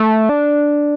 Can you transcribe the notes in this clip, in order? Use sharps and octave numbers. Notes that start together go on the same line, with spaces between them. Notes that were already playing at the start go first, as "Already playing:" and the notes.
Already playing: A3
D4